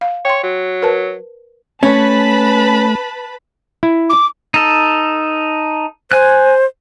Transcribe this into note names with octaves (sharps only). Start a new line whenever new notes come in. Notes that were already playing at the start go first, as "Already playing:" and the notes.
F5
C#5 G5 C6
F#3
A#4 B4 A5
A3 C#4 B4 A5 B5
E4
D6
D#4 A4
C5 G#5 F#6